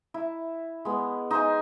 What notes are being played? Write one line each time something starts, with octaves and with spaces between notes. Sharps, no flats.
E4
G#3 B3
D#4 C5 G#5